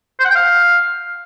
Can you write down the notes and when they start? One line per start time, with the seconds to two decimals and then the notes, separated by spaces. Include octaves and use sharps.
0.20 C5
0.25 F#5
0.30 G5
0.35 F5